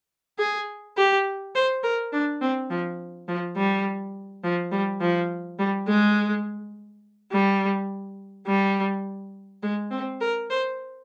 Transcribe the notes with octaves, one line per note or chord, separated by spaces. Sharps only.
G#4
G4
C5
A#4
D4
C4
F3
F3
G3
F3
G3
F3
G3
G#3
G3
G3
G#3
C4
A#4
C5